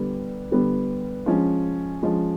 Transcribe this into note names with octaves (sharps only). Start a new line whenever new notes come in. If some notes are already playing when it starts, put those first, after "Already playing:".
Already playing: D3 G3 B3
D3 G3 B3
F3 G#3 C#4
F3 G#3 C#4